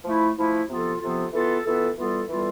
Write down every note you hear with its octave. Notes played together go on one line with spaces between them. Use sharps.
F3 A3 E4
F3 A3 E4
C3 F3 B3 F4 A4
C3 F3 B3 F4 A4
E3 B3 F4 A4
E3 B3 F4 A4
E3 G3 B3 F4 A4
E3 G3 B3 F4 A4